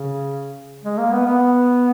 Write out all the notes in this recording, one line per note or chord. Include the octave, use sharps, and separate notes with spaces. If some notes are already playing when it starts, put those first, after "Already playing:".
Already playing: C#3
G#3
A#3
B3
B3